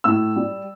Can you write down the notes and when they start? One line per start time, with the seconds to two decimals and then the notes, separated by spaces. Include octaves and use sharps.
0.04 A2 E6
0.36 G3